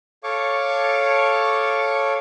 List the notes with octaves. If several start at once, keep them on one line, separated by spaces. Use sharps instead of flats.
A4 C#5 F5 C#6 D6